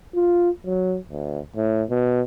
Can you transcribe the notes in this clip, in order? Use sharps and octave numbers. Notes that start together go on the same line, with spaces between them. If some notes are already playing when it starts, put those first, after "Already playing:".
F4
F#3
D2
A2
B2